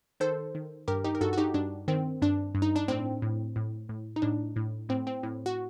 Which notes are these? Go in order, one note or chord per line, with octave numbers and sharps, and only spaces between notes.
D#3 A4 C5
D#3
G2 G4 A#4
D#4 G4
A#4
G2 F#4 A4
F#4
D#4 G4
G2 D4
D#3 C4
G2 D4
G2
D#4
D4
A2 C4
A2
A2
A2
D#4
A2 D4
A2
A2 C4
C4
A2
F#4